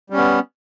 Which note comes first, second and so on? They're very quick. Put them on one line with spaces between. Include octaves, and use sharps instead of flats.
G3 C#4 B3